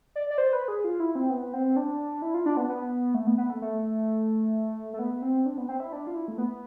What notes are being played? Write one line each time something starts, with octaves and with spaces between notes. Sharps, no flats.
D5
D5
C5
B4
G#4
F4
E4
C4
B3
C4
D4
E4
F4
D4
B3
B3
A3
B3
B3
A3
A3
A3
B3
C4
D4
B3
C4
E4
D4
F4
E4
A3
B3